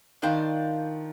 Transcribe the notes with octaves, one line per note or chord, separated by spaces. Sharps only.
D#3 D4 F4 C5 G5